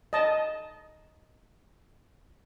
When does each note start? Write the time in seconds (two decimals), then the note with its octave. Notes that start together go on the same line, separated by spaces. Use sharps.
0.13 D#5 A5